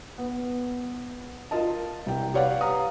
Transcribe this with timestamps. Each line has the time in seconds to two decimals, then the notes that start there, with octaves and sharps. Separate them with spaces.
0.18 B3
1.51 F4 A#4 D#5 A5
2.06 C2 G5
2.34 G4 B4 C#5 D5 F5 F#5
2.61 F5 A#5 D#6